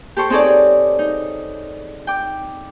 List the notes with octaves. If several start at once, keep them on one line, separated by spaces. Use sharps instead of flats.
G4 A4 C5 C#6
C4 D#4 G#4 A4 C#5 D5
D#4
G5 D6